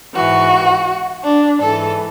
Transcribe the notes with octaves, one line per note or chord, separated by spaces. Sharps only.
G#2 E3 F#4
D4
G#2 E3 A4